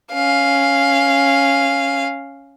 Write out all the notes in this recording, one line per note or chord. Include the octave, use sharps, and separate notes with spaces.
C#4 F5